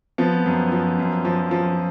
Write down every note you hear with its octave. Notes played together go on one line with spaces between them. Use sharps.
F3 B3
F#2
F3
F#2
F3
F3